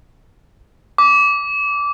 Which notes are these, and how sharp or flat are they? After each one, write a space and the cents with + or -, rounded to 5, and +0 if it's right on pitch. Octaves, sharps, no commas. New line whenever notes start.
D6 -20